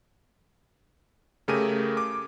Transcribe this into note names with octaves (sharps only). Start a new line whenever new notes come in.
C#3 A3 G4 G#4 A#4 D#7
D6